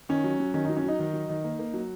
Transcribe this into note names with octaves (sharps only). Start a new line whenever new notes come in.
D#3 C#4
F#3
F#3
D#3 C#4
F#3 D#4
C#4
F#3 D#4
D#3
F#3
D#3
A#3
A#3
F#3